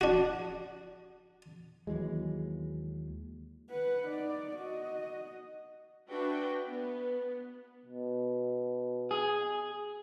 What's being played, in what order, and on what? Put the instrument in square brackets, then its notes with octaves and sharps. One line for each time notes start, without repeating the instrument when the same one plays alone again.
[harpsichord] D4 F#4
[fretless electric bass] D#2 E3 F#3 G#3
[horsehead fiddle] B4 F#5
D#4 D5
F#4 D#5
[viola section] D4 F#4 B4 E5 G5
B3
[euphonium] B2
[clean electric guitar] G#4